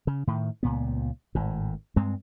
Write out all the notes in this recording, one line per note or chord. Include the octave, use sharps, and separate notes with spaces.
C#3
A2 D#3
C#2 A#2 B3
G#1 A2
G2 G#3 C4